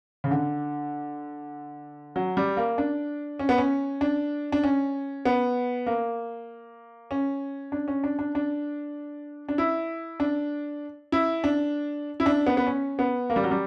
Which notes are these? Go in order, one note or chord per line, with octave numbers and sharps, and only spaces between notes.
C#3
D3
F#3
G3
A#3
D4
C#4
B3
C#4
D4
D4
C#4
B3
A#3
C#4
D4
C#4
D4
D4
D4
D4
E4
D4
E4
D4
E4
D4
B3
B3
C#4
B3
A#3
G3
F#3
G3